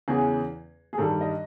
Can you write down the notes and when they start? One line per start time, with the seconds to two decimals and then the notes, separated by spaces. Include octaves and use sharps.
0.08 E2 C#3 E3 G#4
0.93 G#4
0.98 G2 D#3 G3 A4
1.21 D#5